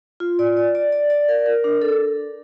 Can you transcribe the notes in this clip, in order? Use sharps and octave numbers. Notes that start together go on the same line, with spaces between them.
F4
D5
D5
D5
D5
D5
A#4
A#4
D4
A4